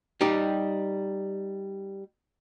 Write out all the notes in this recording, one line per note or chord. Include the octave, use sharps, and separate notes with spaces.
G3 D#4 G4